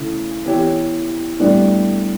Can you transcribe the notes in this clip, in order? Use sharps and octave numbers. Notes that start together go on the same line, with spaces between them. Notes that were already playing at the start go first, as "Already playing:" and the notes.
Already playing: C#3 E3 A3 C#4
E3 B3 E4 G4 C#5
A2 G3 B3 D4